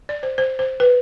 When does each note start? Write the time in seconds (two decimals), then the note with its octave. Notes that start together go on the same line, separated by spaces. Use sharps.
0.09 D5
0.23 C5
0.38 C5
0.59 C5
0.80 B4